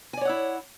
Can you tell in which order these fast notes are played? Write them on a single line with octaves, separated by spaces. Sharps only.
G#5 D5 C#5 F#5 E4